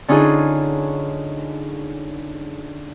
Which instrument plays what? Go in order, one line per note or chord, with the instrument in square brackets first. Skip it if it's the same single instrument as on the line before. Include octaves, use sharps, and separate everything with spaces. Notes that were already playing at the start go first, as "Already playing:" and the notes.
[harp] D3 C#4 D#4 F4 G#4